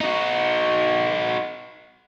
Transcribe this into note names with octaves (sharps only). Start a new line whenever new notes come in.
D#4 F#4